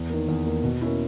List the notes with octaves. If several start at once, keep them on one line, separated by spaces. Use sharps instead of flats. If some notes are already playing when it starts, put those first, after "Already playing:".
Already playing: E2
D#3 A#3
E2
D#3 A#3
B2
A#3 C#4 E4